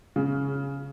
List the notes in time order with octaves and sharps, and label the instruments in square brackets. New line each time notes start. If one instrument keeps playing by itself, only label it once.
[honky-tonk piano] C#3